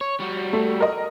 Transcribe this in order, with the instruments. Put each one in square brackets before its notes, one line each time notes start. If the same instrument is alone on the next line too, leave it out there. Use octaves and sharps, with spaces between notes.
[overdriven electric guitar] C#5
G3 F#4
[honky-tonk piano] A3
A#4 D#5